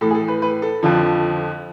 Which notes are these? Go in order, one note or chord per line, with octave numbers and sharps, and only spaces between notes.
A2 E3 A4
G#4
A4
B4
B4
A4
F2 D3 F3